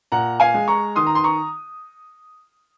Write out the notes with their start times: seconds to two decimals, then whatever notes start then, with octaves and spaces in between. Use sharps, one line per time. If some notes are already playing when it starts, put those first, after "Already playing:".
0.12 A#2 F#5 A#5
0.40 F5 G#5
0.54 G#3
0.68 A#5 C#6
0.96 D#3 C6 D#6
1.07 A#5
1.15 C6
1.24 A#5 C#6